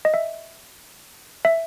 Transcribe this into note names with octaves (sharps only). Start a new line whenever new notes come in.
D#5
E5
E5